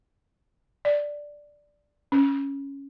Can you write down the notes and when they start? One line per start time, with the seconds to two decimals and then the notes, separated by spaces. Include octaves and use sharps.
0.85 D5
2.12 C#4